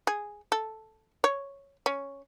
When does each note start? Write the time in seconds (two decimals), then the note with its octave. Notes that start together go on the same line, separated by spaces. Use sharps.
0.07 G#4
0.52 A4
1.24 C#5
1.86 C#4